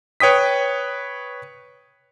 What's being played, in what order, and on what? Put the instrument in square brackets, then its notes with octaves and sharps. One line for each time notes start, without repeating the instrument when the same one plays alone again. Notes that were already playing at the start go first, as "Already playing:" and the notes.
[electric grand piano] B4 C#5 G5 D#6 B6